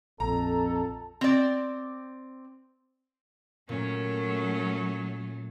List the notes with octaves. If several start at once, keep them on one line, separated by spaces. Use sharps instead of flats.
A#1 F2 A4 A#5
C4 D5
A#2 F#3 A3 C#4